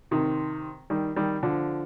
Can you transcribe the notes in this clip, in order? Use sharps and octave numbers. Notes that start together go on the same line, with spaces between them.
C3 D#3
D#3 G3
D#3 G3
D3 F3